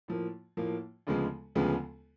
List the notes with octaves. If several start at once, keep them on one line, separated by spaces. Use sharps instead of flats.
A2 F3 A#3
A2 F3 A#3
D2 C#3 F3 G#3 B3
D2 C#3 F3 G#3 B3